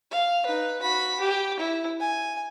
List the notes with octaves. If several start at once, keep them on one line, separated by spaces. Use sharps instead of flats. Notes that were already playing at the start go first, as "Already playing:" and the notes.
F5
D#4 B4
F#4 B5
G4
E4
G#5